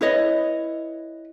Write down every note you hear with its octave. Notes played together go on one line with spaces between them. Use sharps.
E4 B4 C#5 D#5